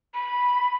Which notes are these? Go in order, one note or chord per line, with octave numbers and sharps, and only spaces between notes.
B5